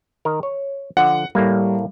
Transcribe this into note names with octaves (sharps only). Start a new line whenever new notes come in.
D#3 A#4
C#5
D3 F3 F#5
A2 G3 A3 A#3